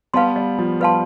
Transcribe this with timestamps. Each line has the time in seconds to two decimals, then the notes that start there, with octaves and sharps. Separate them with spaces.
0.14 G3 B3 B4 F5 A5 C6
0.36 G3
0.59 F3
0.81 G3 B4 F5 A5 C6